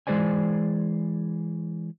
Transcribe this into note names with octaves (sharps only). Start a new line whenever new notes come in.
E3 G#3 G#4 C5 D5 G#5